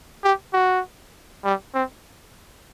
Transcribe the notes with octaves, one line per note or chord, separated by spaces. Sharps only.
G4
F#4
G3
C4